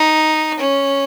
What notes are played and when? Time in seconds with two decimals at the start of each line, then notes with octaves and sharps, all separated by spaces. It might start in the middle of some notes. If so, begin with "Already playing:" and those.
Already playing: D#4
0.59 C#4